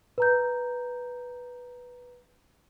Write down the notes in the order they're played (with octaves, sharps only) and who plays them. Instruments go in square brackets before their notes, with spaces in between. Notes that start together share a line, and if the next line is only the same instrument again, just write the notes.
[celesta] B4 A#5 G6